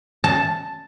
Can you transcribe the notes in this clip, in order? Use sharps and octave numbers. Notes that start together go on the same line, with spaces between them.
A5